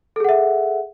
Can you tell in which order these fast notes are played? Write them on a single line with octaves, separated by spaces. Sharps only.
A4 G#4 F#5 E5